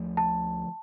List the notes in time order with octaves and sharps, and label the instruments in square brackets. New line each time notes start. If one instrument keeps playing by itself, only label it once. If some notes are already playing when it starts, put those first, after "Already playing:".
Already playing: [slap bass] D2 D3 F3 A3
[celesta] A5